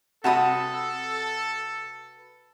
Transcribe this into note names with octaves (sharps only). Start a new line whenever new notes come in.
C3 F#4 A4 B4 A5 B5 D#6